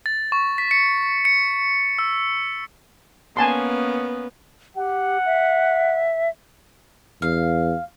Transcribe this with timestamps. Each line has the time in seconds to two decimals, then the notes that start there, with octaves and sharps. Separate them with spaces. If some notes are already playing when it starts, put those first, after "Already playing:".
0.06 A6
0.32 C#6
0.58 B6
0.71 C#7
1.25 C#7
1.99 E6
3.37 A#3 B3 C#4 G#5 A5 C6
4.76 G4 F#5
5.26 E5
7.22 E2 F5